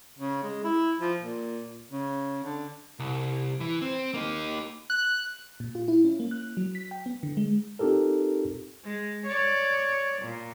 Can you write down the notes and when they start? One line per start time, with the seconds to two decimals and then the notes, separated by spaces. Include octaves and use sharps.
0.19 C#3
0.43 G#3
0.64 E4
0.99 F3
1.22 A#2
1.91 C#3
2.44 D3
2.99 C2
3.61 E3
3.82 C4
4.14 A#3 D#4
4.90 F#6
5.60 A#2
5.75 F4
5.88 E4
6.05 C#4
6.20 A#3
6.31 F#6
6.57 F#3
6.75 B6
6.91 G5
7.06 B3
7.23 D3
7.37 G#3
7.79 C4 D#4 F4 G4 A4 A#4
8.85 G#3
9.27 C#5 D5
10.23 A#2